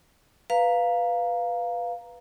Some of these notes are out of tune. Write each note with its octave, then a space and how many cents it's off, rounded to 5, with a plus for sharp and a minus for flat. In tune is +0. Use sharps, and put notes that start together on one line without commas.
B4 +0 F5 +0 A#5 +0